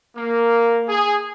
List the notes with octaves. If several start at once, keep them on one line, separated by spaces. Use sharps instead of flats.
A#3
G#4